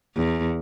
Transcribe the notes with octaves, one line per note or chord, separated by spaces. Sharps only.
E2